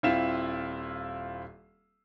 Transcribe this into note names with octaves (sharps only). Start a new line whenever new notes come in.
D#1 C4 E4 F4 E5 E7